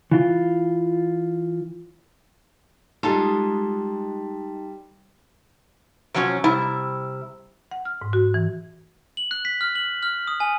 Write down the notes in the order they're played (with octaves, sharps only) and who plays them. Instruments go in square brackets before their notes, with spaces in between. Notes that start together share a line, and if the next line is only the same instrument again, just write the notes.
[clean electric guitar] E3 F4
[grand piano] G3 [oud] G#3 F4 A4 [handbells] D#4 A5 C6
[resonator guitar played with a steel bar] C3 F3 F#3 B3 C#4
C3 G3 E4
[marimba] F#5
F6
G#2
F#4
E3
[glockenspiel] F#7
F#6
B6
F6
F#7
F6
D#6
G#5